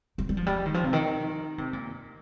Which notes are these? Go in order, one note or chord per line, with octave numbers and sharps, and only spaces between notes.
G3
G3
F3
G3
D#3
F3
C3
D#3
C3
A#2